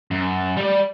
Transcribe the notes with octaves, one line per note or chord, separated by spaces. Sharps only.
F#2
G3 D5